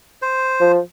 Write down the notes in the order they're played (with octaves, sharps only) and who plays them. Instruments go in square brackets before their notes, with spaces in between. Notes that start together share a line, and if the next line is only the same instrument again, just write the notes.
[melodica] C5
[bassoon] F3